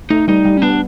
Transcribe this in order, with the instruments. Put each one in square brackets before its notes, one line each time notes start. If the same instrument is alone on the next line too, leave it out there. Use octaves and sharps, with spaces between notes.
[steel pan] A3 [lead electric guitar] D#4
[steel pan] G3 [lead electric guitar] D#4
[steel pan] G3
[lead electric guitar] C#4
[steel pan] B3 [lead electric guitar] D4